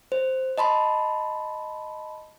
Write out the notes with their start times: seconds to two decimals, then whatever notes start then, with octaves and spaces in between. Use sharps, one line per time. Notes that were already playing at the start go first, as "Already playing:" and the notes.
0.12 C5
0.58 D#5 A5 B5 C6